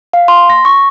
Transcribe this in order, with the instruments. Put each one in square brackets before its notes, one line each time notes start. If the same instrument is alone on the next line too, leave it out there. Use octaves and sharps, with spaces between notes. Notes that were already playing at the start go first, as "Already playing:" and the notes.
[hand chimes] F5
C6
A#6
C#6